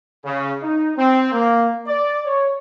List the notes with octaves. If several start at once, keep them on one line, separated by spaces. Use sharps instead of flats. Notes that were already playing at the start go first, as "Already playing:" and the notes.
C#3
D#4
C4
A#3
D5
C#5